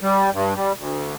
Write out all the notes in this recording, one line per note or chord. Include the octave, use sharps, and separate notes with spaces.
G3
G2
G3
D2